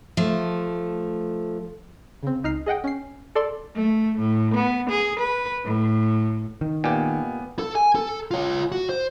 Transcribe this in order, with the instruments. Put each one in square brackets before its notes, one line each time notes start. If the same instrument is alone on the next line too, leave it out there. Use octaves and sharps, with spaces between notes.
[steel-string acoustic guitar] F3 A3
[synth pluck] C#3 C4
C#2 D#4 F6 C7
G#4 D#5 F#5 G5
C#4 C7
A4 D5 C6
[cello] A3
A2
B3
G#4
B4
A2
[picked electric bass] D#3
[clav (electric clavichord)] A#2 G4 [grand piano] B3 G#5
[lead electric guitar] A4
G#5
A4
F4 C#5
F#4
C5